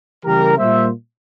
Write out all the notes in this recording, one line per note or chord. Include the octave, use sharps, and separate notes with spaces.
C#3 E3 G3 A#3 G4 A#4
A#2 G3 A#3 C5 E5